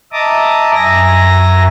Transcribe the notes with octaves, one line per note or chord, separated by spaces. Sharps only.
D#5 E5 A5 A#5 D6 D#6
F#2 E5 G#5 A#5 A#6